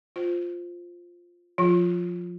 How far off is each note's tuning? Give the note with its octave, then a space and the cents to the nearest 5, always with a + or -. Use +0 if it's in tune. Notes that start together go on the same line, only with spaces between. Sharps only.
F4 +0 C5 -10
F3 +20 F4 +0